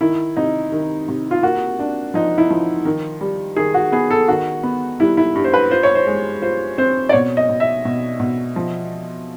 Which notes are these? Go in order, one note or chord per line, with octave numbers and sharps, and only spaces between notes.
D#3 E4
C3 D#4
D#3
C3
F4
A#3 F#4
D4
F3 D#4
E4
F3
D#3
G3
D#3 G#4
F#4
B3 G#4
A4
D#3 F#4
B3
G3 E4
E4
G2
C5
B4
F4 C5
C#5
C5
G#3
F4 C5
C4 C5
D5
B2 C#5
D#5
B2
E5
B2
B2
F3